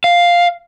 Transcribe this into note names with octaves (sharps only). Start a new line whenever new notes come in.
F5